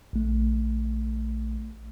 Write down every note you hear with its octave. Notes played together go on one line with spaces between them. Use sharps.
A#1 A3